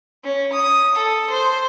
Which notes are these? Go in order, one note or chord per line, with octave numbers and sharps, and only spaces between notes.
C#4
D#6
A4
C5